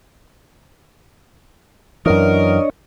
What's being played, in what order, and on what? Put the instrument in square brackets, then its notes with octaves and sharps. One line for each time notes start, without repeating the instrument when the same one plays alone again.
[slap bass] F#2 E3 [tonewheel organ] D4 C#5 D#5 [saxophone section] A#4